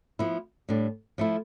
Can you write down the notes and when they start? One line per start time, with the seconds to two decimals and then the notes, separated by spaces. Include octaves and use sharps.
0.19 F3 B3 E4
0.69 A2 G3 D4
1.18 F3 A3 E4